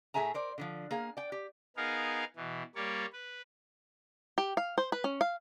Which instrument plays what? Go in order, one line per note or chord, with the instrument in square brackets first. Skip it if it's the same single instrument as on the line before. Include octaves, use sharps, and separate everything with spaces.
[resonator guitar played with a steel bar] A2 A3 G#4 E5 G#5 A#5
A#4 C5 D5
D3 E3 F3
A#3 G#4 F5
D5 G5
G4
[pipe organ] B3 D#4 G#4 A#4 F5
B2 E3
G3 A#3 C#5 D5
B4
[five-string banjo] G4
F5
C5
B4
C#4
F5